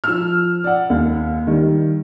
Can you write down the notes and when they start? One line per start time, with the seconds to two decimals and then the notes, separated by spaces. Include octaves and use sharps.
0.04 F3 E6 F6
0.64 D5 F#5
0.90 D#2
1.47 D#3 G3